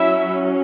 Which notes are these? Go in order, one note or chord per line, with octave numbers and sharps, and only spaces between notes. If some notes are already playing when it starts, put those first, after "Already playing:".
Already playing: F#3 C#4 E4 E5